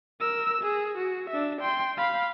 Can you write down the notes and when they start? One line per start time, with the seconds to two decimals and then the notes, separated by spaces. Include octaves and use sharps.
0.20 A#4 E6
0.62 G#4
0.98 F#4
1.30 D4 E5
1.61 G5 C6
1.97 F5 B5